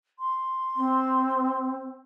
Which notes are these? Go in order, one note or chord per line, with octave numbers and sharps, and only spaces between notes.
C6
C4